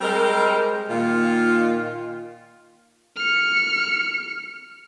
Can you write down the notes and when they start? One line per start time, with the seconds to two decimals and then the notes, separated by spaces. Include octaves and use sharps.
0.01 G3 G#3 C4 A#4
0.90 A#2 D#3 F4
3.16 F6 C#7